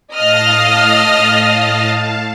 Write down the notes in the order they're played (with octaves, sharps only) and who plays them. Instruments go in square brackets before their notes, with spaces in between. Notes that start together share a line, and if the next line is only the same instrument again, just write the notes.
[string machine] A2 F5 A5 [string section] D#5 D#6 F6